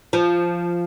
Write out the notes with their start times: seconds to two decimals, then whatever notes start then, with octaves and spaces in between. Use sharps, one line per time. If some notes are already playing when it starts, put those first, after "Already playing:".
0.13 F3